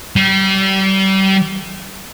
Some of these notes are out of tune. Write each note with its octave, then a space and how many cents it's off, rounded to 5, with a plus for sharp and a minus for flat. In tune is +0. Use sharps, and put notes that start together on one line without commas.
G3 -30